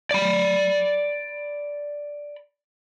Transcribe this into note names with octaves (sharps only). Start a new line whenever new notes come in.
D5 B5